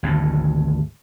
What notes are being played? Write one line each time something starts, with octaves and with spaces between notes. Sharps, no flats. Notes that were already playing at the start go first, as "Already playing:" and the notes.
G#1 D2 A2